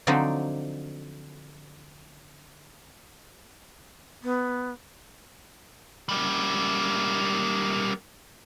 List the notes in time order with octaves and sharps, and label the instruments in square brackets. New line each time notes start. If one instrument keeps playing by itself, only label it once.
[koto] D3 F3 F#3 C4 D4 D#4
[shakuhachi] B3
[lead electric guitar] G3 A#3